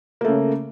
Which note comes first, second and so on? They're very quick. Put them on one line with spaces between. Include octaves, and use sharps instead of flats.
A#3 A3 C#3